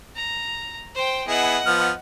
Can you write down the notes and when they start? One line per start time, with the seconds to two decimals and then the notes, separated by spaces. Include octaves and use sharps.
0.16 A#5
0.95 C5 G5
1.28 B3 E4 G#4 D#5 F#5
1.66 F3 B3 F6